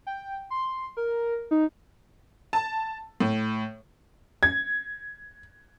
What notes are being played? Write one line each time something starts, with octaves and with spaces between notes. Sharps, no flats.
G5
C6
A#4
D#4
A5
A2
G#6